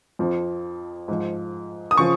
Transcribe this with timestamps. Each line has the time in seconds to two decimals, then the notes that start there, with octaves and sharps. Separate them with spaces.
0.19 F2 F3
1.08 G#2 F3
1.91 D#6
1.98 C#3 F3 C#6